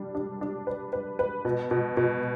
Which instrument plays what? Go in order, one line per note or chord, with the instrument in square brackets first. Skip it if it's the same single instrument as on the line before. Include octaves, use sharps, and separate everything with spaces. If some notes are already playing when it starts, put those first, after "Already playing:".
Already playing: [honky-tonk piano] G3 D4
D4
D4
B4
B4
B4
B2
B2
B2